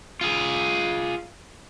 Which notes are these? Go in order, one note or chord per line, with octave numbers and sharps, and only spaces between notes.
F4 G#4